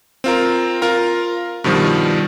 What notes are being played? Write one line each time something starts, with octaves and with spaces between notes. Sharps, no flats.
C4 F4 A#4
F4 A#4 A#5
G2 B2 D#3 F3 G3